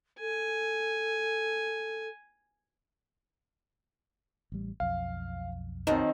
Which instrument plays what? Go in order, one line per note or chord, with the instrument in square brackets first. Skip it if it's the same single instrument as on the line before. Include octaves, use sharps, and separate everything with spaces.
[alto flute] A4 [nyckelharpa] G#5
[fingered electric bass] A1 G3
[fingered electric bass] B1 F2 [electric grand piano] F5
[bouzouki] D#3 F3 F#3 [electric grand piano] C4 D#4